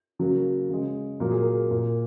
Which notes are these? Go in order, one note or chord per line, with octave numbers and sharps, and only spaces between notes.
C#3 F#3 A#3
C#3 G#3
A#2 F#3 A#3 A#4
G#4
A#4
A#2 A#3